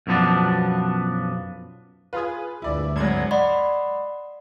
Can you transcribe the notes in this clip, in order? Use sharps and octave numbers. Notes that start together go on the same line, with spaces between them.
B1 F#2 F3 B3 D4
F4 G#4 B4
D2 G2 E4 D5
G#1 F#3 G#3 C5 G#6
D5 D#5 F#5 B5 C6